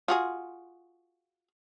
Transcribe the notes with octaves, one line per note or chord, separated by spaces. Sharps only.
F4 F#4 G#4